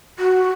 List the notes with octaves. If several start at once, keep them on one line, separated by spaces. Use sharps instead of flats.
F#4